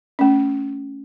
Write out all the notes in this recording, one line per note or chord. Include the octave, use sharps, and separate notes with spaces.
A3 C#4